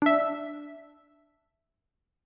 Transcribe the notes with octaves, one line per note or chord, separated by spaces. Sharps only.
D4 E5